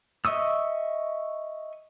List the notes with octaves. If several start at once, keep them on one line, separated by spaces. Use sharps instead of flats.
D#5 E5 C#6 D#6 E6